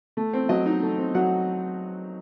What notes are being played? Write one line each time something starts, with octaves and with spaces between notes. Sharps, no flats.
A3
C4
F#3 D#5
D#4
A3
C4
F#3 F#5